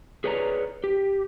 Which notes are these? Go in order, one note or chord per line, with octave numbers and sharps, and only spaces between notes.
G#4 B4 C#5 D5 A#5
G4